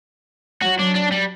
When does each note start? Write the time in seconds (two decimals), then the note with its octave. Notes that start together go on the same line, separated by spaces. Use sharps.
0.62 F#3 F#4
0.79 D4
0.95 D4
1.11 G3